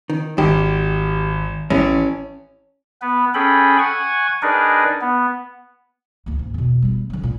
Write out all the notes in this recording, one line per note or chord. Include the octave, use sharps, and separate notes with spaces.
D#3
G#1 G4
A1 C#4
B3 B4
C#4 G#4 A4 G5 B5
F#5 G#5 C#6
D4 D#4 G#4 A#4 B4 D5
B3
D2 A#3
G#2
E2 B2
G3 B3
D3 F#3
A#2 A#3